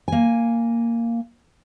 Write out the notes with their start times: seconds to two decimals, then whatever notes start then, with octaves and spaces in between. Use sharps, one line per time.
0.08 A#3 G#5